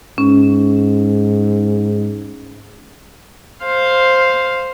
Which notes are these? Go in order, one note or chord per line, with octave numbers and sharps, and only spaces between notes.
G#2 C#4
C5 F5